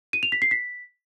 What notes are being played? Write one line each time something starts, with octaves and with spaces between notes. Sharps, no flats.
D#7
F7
B6
C7
B6